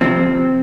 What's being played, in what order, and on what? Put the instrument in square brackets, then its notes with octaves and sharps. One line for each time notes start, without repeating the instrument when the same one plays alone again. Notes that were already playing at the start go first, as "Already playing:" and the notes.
[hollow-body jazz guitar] D2 C3 F3 C4